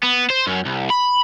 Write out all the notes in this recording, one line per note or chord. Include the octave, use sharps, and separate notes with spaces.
B3
C5
F#2
C2
B5